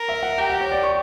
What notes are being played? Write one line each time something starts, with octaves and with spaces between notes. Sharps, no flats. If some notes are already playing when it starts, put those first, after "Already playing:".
Already playing: A#4
E5
F#5
G4 G5
F#5
C#5
D5
C#6